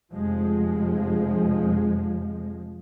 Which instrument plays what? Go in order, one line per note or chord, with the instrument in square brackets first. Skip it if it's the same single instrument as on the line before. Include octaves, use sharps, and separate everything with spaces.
[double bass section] F1 F3 G#3